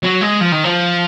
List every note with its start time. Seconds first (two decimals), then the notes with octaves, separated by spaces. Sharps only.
0.03 F#3
0.21 G#3
0.41 F3
0.52 D#3
0.64 F3